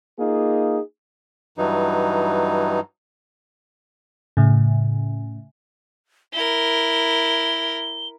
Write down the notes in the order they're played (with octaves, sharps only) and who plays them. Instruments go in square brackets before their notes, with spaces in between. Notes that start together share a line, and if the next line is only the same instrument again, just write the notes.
[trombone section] A#3 D#4 F4 G#4
[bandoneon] G2 E3 F#3 D#4
[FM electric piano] A2 C#3
[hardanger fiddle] E4 A#4 [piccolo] G7